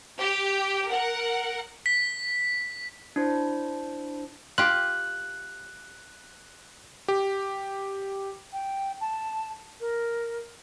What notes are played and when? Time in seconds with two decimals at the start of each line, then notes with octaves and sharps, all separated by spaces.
0.17 G4
0.88 A#4 F#5
1.86 B6
3.16 D4 E4 C5
4.58 F4 G4 F#6
7.08 G4
8.53 G5
9.01 A5
9.80 A#4